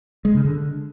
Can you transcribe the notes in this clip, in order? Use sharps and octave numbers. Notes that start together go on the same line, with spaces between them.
G#3
C#3
D3